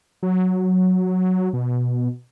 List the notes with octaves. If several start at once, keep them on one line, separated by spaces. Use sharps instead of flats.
F#3
B2